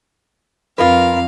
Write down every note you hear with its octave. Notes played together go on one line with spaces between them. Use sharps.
F2 F4 A#4 B4 F5